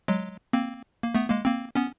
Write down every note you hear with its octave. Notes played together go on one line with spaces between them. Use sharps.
F#3 G#3
A#3 C4
A#3
A3 B3
G#3 A#3
A#3 C4
B3 C#4